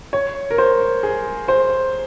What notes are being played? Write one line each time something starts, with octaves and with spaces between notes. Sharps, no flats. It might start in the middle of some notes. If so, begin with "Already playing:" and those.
C#5
A#4
C5
G#4
C5